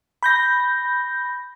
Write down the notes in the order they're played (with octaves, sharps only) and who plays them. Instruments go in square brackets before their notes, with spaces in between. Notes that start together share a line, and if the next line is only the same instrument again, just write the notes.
[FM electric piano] B5 G6 A#6